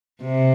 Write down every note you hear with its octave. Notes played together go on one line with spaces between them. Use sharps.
C3